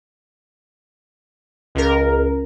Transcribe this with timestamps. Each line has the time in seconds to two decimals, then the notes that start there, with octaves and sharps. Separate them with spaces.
1.75 C#2 A#4